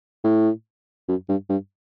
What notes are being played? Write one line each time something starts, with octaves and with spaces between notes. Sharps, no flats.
A2
F#2
G2
G2